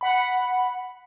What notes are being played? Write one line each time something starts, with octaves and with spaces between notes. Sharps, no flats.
F#5 B5